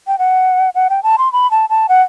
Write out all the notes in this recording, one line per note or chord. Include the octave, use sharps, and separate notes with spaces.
G5
F#5
F#5
G5
A5
C6
B5
A5
A5
F#5